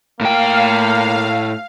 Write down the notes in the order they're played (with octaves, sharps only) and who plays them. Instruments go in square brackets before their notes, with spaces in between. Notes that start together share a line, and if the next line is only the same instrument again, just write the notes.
[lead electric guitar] A2 G5 [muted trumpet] A#3 [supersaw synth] F5